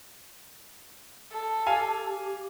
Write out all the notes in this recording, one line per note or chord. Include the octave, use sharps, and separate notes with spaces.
A4
G4 F5 G#5